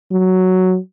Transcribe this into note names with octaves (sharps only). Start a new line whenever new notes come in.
F#3